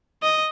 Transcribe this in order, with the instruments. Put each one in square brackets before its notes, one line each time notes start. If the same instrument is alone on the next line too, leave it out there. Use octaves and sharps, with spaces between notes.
[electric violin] D#5